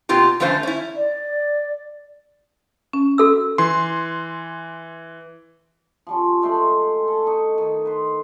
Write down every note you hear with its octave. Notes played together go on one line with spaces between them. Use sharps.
B2 A#3 C4 F4 G4
F2 D3 A3 C#4 C5 F5
C#4 E4
D5
C#4
F#4 A4 E6
E3 C6
F3 G3 C#4
G#3 A3 C5 D5
A4
D#4 C#6
D#3
B4 C5